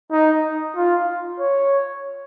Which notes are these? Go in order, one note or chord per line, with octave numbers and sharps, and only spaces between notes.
D#4
F4
C#5